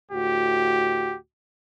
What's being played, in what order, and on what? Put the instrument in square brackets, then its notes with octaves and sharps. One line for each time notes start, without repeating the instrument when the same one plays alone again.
[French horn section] D2 A2 F#4 [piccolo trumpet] G4